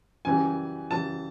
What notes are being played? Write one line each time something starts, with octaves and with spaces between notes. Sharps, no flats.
F#2 C#3 E3 G3 G#5
F#2 C#3 E3 G3 A5